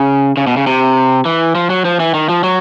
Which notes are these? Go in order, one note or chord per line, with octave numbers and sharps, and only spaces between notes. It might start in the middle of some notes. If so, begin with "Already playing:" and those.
Already playing: C#3
C#3
B2
C#3
C3
E3
F3
F#3
F3
E3
D#3
F3
F#3